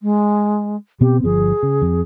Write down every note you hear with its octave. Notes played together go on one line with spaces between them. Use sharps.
G#3
B2 B3 C4 G4
G1 F3 G#4
C#3
F2